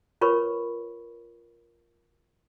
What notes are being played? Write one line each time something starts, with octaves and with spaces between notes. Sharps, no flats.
F4 A#4 B4 C#5 B5 C#6